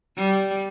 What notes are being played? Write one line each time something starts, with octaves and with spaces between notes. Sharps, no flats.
G3